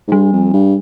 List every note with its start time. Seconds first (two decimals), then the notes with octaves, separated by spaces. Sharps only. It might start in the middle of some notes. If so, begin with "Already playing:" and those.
0.08 G#2
0.12 G2 G3
0.33 F2
0.53 G2